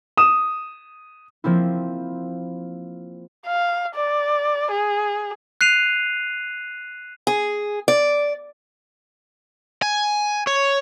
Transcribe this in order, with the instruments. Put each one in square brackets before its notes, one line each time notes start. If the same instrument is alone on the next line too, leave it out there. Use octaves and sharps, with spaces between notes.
[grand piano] D#6 E7
[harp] F3 A#3 C4 E4
[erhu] F5
D5
G#4
[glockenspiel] F#6 C7 D#7 F7
[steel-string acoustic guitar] G#4
D5
[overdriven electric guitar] G#5
C#5